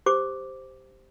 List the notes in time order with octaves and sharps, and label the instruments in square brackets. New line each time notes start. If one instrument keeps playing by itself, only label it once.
[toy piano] G4 C5 D6